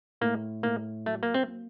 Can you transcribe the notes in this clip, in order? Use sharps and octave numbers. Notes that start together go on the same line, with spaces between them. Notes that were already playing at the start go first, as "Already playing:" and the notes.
A2 A#3
A2 A#3
F#3 A3
A#3
C4
A#3